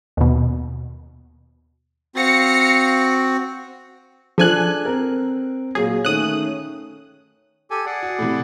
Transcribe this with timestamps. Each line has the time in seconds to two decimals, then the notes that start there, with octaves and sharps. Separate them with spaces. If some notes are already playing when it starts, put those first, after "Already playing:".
0.17 D#2 B2
2.15 C4 F#4 F5 A#6 C#7
4.38 F3 D4 G#4 A4 G#5 F#6
4.85 C4 A#4
5.75 A#2 F#3 G#4
6.05 D#3 A3 C#4 D#6 F#6
7.71 G4 A4 G#5
7.86 G#4 D5 F#5
8.03 F#4
8.19 A2 C3